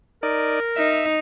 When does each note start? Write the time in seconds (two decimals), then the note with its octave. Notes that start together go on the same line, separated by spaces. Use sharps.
0.23 D#4 A#4 D5
0.76 D#4 E5